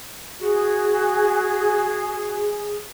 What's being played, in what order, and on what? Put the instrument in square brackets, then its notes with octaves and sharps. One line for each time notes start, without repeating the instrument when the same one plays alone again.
[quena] F#4 [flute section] G#4